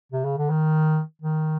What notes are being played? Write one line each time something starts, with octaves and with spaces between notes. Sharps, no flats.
C3
C#3
D3
D#3
D#3